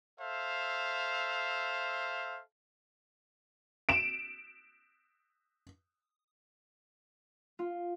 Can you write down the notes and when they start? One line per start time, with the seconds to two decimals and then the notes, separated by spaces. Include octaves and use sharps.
0.20 A4 C5 E5 F5
3.89 D7 E7
7.59 F4